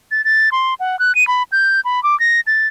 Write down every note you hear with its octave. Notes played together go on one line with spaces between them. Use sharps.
A6
A6
C6
F#5
F#6
D#7
B5
G6
B5
D6
A#6
A6